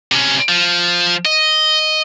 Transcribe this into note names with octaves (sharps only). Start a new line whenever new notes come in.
C3 C#4
F3
D#5